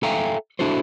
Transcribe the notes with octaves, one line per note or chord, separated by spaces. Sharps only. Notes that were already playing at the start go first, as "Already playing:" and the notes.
A4 E5 F5 G5 G#5 A#5
D4 E4 F#4 A4 C5